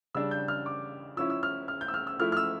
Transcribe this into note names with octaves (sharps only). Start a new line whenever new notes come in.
C#3 G3 D4 E6
G6
F6
D6
F3 C#4 E4 E6
E6
F6
F6
G6
E6
F6
E6
F3 A3 E4 F6
F6
E6